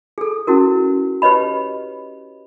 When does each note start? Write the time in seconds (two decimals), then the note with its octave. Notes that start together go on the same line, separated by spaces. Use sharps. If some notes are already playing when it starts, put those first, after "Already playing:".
0.18 G#4 A4
0.47 C#4 E4 F#4 A#4
1.22 G4 B4 C#5 D#5 B5